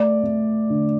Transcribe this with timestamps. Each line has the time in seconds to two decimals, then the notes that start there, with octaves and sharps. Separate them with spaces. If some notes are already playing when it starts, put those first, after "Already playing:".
Already playing: A3 D5
0.24 A3
0.70 D3